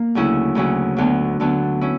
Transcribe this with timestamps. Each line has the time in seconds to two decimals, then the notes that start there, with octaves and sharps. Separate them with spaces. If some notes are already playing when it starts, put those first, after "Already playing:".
Already playing: A#3
0.15 D2 C#3 F#3 C#4 E4
0.55 D2 C#3 F#3 C#4 E4
0.97 D2 D3 F#3 B3 D4
1.40 D2 D3 F#3 B3 D4
1.81 C#4 E4